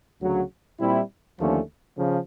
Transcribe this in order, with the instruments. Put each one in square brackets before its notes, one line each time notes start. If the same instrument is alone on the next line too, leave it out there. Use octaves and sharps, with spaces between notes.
[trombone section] D2 C#3 F#3
A#2 G3 C4 E4
D#2 D3 F3 A3 C#4
C#3 F3